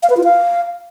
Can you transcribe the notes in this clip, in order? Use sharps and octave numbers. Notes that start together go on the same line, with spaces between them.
F5
B4
F4
F5